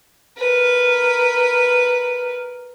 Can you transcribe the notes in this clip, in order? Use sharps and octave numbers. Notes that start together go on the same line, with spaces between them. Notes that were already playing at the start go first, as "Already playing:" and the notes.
A#4 B4